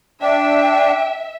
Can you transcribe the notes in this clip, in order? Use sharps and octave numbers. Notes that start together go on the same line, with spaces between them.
D4 E5 G5